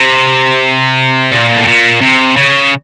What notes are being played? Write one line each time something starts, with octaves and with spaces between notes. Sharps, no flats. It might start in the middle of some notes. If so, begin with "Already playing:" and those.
Already playing: C3
A#2
A2
A#2
C3
C#3